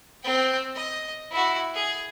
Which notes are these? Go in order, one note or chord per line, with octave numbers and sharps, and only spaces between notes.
C4 G5
D#5
E4 F#4
G#4